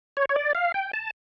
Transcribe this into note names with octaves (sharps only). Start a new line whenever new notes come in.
C#5
C#5
D5
F5
G5
A5